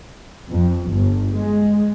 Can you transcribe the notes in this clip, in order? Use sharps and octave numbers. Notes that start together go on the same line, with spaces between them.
F2
G1
G#3